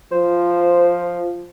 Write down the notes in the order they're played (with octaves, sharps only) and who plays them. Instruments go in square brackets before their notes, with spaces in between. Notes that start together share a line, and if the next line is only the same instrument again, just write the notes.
[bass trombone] F3 [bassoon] C5